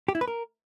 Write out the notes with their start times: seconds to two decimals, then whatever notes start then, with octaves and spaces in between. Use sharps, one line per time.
0.08 G4
0.15 E4
0.21 B4
0.28 A#4